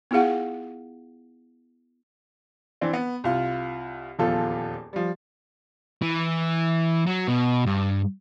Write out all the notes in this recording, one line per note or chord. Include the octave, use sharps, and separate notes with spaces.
B3 E4 F4 G#4 F5 F#5
E3 C4 D4
B3
C2 F4
D#1 E2 F3 F4 A4
F3 G3
E3
F#3
B2
G2